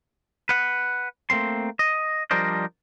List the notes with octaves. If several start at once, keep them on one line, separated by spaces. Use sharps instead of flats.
B4 F#5
A3 A#3 C4 C6
D#5
F3 G3 D4 A#4 C5 D#5